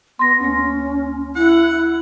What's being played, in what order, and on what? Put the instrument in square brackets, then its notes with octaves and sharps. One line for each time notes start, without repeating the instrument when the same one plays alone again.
[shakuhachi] B3 [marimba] C6 A#6
[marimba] D2 A#3 [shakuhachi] C#4
[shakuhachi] E4 [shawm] F#5